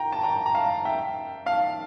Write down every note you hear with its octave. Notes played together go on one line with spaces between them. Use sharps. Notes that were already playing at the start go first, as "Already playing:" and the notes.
Already playing: G5 A#5
A5
G5 A#5
A#5
F5 A5
E5 G5
F5 A5